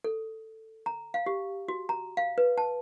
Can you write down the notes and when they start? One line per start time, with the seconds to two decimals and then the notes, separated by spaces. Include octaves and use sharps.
0.04 A4
0.86 A#5
1.14 F5
1.26 G4
1.68 F#4
1.89 A#5
2.17 F5
2.38 B4
2.58 A5